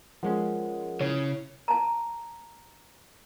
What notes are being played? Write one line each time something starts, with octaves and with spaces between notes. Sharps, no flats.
F3 G#3 C#4 F4 A#4 F#5
C#3 E4 C#5
A5 A#5